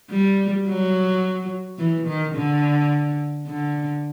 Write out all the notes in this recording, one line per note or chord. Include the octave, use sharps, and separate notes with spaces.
G3
F#3
E3
D#3
D3
D3